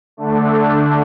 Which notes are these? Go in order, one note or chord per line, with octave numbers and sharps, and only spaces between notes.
D3 A3 D4